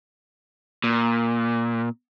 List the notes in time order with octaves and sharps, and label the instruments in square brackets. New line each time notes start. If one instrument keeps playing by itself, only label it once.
[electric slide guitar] A#2